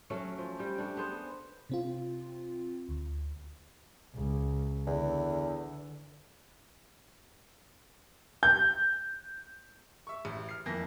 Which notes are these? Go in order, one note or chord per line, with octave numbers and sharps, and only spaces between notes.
F#3 A3 C#4 A#4
F3
G3 G4
A3 D4
B3 G#4 A4 C5
C3 C4 F4
D2
C#2
E2 D3
G6
E5 C#6
A1
F6 C7
F2 E3 A#3 A#6